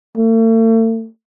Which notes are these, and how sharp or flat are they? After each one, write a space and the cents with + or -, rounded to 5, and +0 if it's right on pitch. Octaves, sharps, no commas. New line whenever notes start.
A3 +40